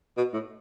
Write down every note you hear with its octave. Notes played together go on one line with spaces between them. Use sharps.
B2
A2